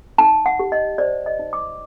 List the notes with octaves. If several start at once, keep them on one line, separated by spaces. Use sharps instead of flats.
D#4 A5
F#5
G4
D#5
C5 D5
D#5
D#4
D6